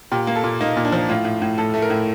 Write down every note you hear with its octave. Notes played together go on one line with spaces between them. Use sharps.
A#2 G4
A#3
A4
A#2
A#3 D#4
A#2
D4
F3
A2 F4
A2
A2
A2 A4
A3
A#4
A2